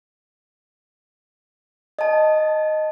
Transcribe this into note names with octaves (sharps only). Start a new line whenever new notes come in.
D#5 A5